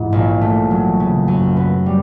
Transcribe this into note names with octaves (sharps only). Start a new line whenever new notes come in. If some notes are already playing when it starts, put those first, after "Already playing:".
Already playing: G#2 E3
A#1
A3
F#3
C#3
F#2
B3
G3